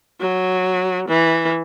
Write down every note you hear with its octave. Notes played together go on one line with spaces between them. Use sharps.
F#3
E3